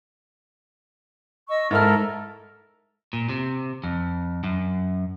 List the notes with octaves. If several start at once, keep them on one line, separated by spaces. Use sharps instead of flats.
D#5 C#6 E6
G#2 E4 A4 A#4 F6
A#2
C3
F2
F#2